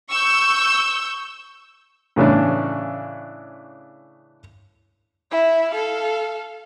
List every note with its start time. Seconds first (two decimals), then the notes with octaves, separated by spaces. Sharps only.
0.10 C#6 E6 G6
2.16 A2 C#3 E3 C#4 D4
5.31 E4 E5
5.71 A4 F5